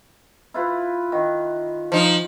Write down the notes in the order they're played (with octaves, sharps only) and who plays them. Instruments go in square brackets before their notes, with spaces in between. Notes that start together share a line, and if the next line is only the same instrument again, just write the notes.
[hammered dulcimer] E4 F4 B4
D#3
[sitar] F3 D#4